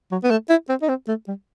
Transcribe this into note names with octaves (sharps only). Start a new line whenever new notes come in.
F#3
B3
A3
E4
C4
D#4
C4
A3
G3